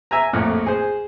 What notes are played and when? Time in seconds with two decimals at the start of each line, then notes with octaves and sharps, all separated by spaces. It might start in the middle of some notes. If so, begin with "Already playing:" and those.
0.11 E5 G#5 A#5
0.33 A#1 F2 A2
0.66 G#4 C5